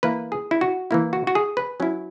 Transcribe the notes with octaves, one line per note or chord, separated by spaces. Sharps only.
E3 A#3 E4 B4
G#4
E4
F#4
E3 A#3 E4
F#4
F#4
G#4
B4
F#3 C#4 E4